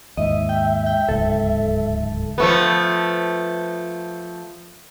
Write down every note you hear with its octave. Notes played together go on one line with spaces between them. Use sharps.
D#2 G#2 D#5 E5
G5
G5
D1 C#2 G#2 A4
F3 A3 B3